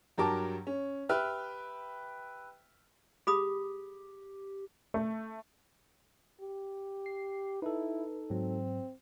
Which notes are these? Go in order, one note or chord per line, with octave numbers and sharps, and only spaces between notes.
G2 F#3 G4 A#4 A5 D6
C#4
G4 B4 E5 G5 F6
G4 G#4 B5 D#6
A3
G4
C7
D#4 E4 A4 B4
G#2 F#3 C4